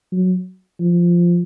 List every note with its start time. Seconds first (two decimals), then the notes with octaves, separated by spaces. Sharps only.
0.12 F#3
0.80 F3